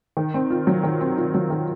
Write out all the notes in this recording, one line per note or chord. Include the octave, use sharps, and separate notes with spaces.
D#3
C4
F4
F#3
D#3
C4
F4
F#3
D#3